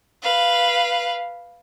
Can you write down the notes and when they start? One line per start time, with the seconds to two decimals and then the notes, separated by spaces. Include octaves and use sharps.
0.23 B4 F5